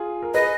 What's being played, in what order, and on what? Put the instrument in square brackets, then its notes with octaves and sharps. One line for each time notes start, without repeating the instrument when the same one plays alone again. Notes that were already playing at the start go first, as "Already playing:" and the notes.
Already playing: [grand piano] F4 G#4
A#4
[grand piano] G#4 B4 [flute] D#5